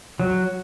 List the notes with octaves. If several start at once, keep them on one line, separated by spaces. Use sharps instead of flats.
F#3